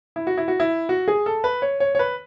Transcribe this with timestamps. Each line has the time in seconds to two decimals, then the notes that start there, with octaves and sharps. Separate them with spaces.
0.16 E4
0.27 F#4
0.37 E4
0.48 F#4
0.60 E4
0.89 F#4
1.08 G#4
1.26 A4
1.44 B4
1.62 C#5
1.80 C#5
1.95 C#5
1.99 B4